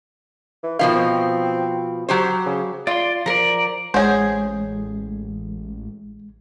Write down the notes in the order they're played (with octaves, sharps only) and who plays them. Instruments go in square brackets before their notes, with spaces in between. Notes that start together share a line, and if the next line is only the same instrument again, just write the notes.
[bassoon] E3
[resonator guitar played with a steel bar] B2 F3 F5 [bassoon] D#3
[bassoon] C4
[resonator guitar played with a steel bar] F#3 G4 C5
[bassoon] C#3
[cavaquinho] F4 [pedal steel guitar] D5 C6
[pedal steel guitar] F3 D5 [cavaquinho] A#4 A#5
[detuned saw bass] A1 [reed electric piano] G#3 [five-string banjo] G#4 C5 [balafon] C#5 F#5